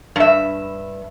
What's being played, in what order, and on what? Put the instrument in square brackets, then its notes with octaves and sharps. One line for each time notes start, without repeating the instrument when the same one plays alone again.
[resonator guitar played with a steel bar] G2 E5